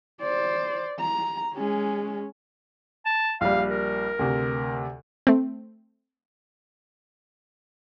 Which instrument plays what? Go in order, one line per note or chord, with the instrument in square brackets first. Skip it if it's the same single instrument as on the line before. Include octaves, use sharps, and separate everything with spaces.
[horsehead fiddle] C5 D5
A#5
G#3 C#4
[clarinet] A5
[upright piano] A#1 G3 [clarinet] F5
[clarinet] A#4
[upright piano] D2 C3
[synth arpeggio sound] A3 C4